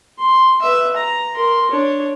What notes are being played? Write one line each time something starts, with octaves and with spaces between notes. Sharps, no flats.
C6
B4 E5
A#5
A#4 C6
D4 C#5